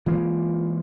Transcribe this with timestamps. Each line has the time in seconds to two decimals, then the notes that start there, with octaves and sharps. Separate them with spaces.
0.06 E3 G#3 A#3 F4